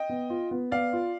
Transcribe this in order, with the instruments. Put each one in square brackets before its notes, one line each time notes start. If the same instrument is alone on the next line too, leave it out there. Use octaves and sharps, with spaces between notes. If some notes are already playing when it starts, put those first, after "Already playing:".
Already playing: [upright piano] D#5 G5
[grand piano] B3
F4
B3
[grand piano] B3 [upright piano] D5 F5
[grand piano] F4